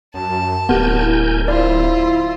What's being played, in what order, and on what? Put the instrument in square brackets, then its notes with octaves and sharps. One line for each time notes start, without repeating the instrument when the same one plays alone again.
[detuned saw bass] F#2 [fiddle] A5
[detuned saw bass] D1 [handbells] B3 G4 [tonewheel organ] A#4 G#5 G6
[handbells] E4
[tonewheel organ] E4 [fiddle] F4 C5 [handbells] D5